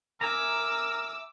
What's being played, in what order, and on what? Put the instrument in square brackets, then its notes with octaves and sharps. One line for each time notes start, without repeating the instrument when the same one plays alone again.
[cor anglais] A#4 [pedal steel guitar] E5 G#5 A#5 [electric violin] D6 E6